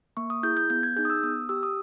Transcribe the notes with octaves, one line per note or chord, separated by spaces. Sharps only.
A#3 C#6
D#6
E4 G#4 G6
G6
B3 G6
G#6
D#4 G#4 G6
D#6
E6
B3 D#6
G4 E6
D#6